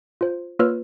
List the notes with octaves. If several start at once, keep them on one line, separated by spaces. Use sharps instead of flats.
F4 C5
A#3 F4 B4 C#5 E6 F6